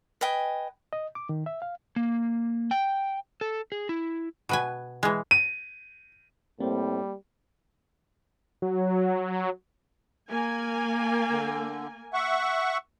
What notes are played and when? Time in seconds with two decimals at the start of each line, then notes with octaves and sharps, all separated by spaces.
0.21 B4 D#5 G5 G#5
0.93 D#5
1.15 D6
1.29 D#3
1.46 E5
1.62 F5
1.96 A#3
2.71 G5
3.41 A4
3.72 G#4
3.89 E4
4.49 B2 B4 G#5
5.03 E3 G#3
5.31 D#7
6.60 A2 G3 A#3 C4 C5
8.62 F#3
10.30 A#3 G#5
11.30 D3
12.13 E5 F#5 C#6